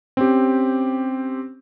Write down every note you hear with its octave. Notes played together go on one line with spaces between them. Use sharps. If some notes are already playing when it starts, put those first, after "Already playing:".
C4 C#4 G4